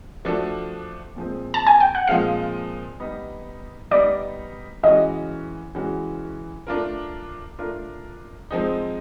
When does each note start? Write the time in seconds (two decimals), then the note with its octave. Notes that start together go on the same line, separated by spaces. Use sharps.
0.25 F3 A3 D4 F#4 A4
1.16 A#2 F3 G#3 C4
1.54 A5
1.67 G#5
1.80 G5
1.95 F#5
2.08 A#2 F3 G#3 C4 F5
3.00 G3 B3 D#4
3.91 G3 B3 D#4 D5
4.83 E3 G#3 C#4 F#4 D#5
5.75 E3 G#3 C#4 F#4
6.67 A3 D4 F4 A#4
7.59 A3 D4 F4 A#4
8.51 F3 G#3 C4 D#4